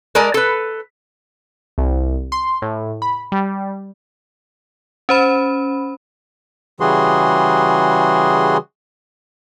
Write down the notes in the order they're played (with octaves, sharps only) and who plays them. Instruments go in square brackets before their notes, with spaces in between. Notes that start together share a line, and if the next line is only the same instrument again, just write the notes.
[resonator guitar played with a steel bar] G#3 A4 A#4 D5 G#5 A#5
A4 B4
[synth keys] C2
C6
A2
B5
G3
[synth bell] C#4 C5 B5
[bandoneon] C#3 E3 G3 F#4 G#4 C6